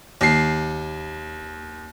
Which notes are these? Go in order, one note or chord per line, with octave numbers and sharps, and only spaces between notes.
D#2 C7